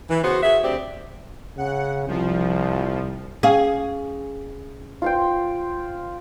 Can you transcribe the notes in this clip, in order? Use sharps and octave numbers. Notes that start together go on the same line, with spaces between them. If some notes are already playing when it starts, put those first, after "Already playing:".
E3
C#3 B3 F#4 C5
F#4 G#4 E5
D2 C4 G4 D5
C#3 F#5
C2 F3
C#4 G#4 F5
F4 C5 G5